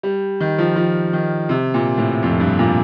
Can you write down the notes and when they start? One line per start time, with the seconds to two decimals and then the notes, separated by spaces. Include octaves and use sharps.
0.03 G3
0.40 D#3
0.58 F3
0.76 F3
1.13 D#3
1.49 C3
1.74 A#2
1.98 A2
2.23 F2
2.40 G2
2.59 A#2